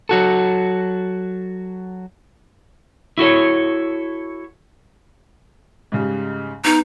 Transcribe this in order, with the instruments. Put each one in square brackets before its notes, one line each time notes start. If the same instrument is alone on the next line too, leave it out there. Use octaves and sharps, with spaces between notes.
[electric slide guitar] F#3 F#4 A4
E4 F#4 A4 C#5
[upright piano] G#2 C#3 G3
[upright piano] B3 [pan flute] D#4